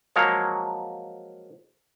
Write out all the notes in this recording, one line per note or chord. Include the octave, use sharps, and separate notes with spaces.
F3 F#3 G#3 A#3 C#5